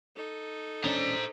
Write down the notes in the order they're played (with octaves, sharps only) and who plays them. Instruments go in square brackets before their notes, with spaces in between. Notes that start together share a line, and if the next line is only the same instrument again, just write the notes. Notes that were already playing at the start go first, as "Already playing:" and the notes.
[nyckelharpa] D#4 A4
[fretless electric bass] E1 C#4 D4 [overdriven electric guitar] C5 A#5